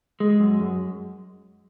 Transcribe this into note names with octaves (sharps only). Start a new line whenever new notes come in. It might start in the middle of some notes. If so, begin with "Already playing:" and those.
G#3
F#2
F#2